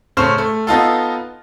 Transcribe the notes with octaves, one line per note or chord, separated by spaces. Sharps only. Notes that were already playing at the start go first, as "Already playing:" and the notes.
A2 C#3 A3 C#4 C5 F6
A3
B3 D#4 F4 A4